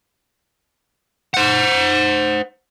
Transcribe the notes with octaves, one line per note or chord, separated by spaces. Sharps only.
C5 F#5